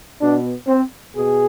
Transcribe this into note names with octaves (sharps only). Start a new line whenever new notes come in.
B2 B3 D4
C4
B2 G#4